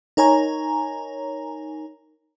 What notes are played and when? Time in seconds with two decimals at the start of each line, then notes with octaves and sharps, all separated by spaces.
0.17 D#4 A#4 C#5 G#5 A#5